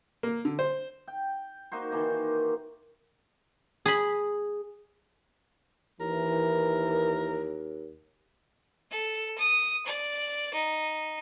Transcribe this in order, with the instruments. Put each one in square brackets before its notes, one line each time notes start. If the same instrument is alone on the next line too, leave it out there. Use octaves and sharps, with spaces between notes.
[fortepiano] A#3
D3
C5
[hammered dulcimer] G5
A#3 D#4 F#4 C5
D#3 E3 A#3 D#4
[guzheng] G#4 B5
[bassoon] D#2 [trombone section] E3 [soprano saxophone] A#4
[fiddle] A4
D#6
D5
D#4